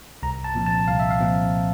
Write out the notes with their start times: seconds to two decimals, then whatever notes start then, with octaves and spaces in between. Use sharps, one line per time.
0.23 C2 A#5
0.44 A5
0.55 A#2 F3 C4
0.66 A5
0.88 C2 F5
0.99 E5
1.10 F5
1.20 A#2 F3 C4